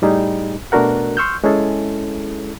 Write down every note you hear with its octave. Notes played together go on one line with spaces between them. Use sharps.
A2 G3 D#4 G#4
B2 A3 D4 F#4 A#4 F#5
C6 C#6 E6 F6 G6
G#3 C#4 E4 G#4 A4